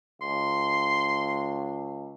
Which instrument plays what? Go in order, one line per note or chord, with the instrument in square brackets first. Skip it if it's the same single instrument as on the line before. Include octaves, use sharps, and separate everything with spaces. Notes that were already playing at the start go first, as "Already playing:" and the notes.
[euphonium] C#2 [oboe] C6